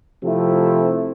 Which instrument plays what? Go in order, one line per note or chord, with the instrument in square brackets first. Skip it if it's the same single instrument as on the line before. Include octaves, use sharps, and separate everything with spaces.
[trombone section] C3 F3 A3 C4 E4